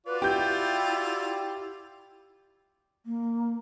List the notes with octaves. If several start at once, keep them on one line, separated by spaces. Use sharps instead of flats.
F4 F#4 B4 D5
E4 G4 G6
A#3